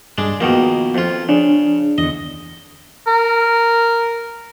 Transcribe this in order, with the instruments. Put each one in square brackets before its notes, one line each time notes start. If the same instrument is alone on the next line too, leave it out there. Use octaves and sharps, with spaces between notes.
[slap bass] G2 [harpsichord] G#3 D4
[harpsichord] B2 D#3 A#3 [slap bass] F3
[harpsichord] F2 F4
[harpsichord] C#3 [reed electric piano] D4
[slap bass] E2 D3 [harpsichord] D#5
[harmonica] A#4